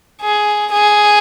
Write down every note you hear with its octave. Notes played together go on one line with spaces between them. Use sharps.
G#4
G#4